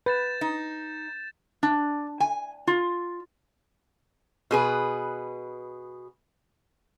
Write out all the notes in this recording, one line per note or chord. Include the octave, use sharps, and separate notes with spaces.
B4 G6 A6 E7
D#4
D4
G#5
F4
B2 G#4 B4